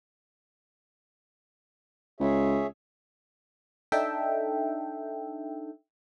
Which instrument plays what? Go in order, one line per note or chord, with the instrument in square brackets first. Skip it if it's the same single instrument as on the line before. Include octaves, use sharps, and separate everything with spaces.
[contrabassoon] C#2 [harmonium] G#4 C#5 E5
[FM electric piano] D4 D#4 A4 E5 G5